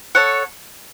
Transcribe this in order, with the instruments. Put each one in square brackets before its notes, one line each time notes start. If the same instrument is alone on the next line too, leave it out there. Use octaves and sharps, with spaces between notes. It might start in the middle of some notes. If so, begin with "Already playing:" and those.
[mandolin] A4 C#5 F#5